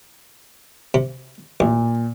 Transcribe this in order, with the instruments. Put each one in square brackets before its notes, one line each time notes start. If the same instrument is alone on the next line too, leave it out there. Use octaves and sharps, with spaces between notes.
[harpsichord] C3
[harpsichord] A1 [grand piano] A#2